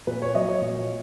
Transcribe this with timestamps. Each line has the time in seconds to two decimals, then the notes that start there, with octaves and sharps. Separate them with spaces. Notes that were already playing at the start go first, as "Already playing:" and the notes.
0.07 A#2 B4
0.22 C#5
0.35 F#3 D#5
0.49 C#5
0.62 A#2